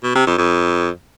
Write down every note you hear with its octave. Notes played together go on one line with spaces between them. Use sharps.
B2
C3
F2
F2